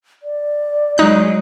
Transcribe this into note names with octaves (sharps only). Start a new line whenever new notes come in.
D5
F#3 G#3 D#4 F#6